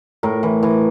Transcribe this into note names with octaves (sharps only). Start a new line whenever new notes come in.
A2 A#4
E3
E3